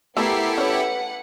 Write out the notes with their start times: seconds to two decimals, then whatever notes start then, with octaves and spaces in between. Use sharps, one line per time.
0.17 A3 B3 E4 G4 A4 A#4 C7
0.58 C#4 B4 C#5 F#5